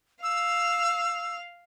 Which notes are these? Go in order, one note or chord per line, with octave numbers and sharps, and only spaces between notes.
F5 E6